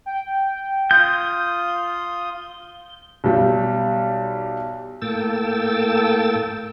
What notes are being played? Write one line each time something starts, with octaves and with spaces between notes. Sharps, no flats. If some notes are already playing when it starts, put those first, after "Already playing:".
G5
F4 D#6 G6
B1 G3
A2 A#3 A4 G5 E6 A6